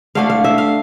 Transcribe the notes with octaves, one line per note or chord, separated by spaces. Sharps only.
D3 A3 D4 F5
F5
E5
F5